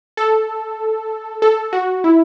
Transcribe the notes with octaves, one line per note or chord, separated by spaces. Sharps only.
A4
A4
F#4
E4